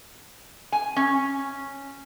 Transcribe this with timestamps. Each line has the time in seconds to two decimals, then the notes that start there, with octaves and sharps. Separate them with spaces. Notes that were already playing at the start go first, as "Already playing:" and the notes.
0.72 G#5
0.96 C#4